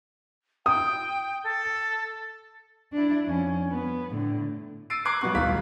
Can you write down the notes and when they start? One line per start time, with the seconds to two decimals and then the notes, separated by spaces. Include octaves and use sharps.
0.66 G5 D#6
1.44 A4
2.93 D4 E4
3.25 F2 C#4
3.71 B3
4.12 A2 D3
4.90 E6 A6 C7 D7 D#7
5.05 A#5 D6 F#6 G#6 C7
5.21 G2 F#3 B3 C#6 F#6
5.34 D#1 B1 A2 D#3 F5 B6